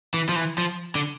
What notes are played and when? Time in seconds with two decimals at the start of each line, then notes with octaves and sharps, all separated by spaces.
0.14 E3
0.29 F3
0.36 E3
0.58 F3
0.95 D3